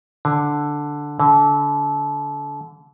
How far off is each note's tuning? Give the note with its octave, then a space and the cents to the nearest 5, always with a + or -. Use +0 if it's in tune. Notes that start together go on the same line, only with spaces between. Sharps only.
D3 +0
D3 -30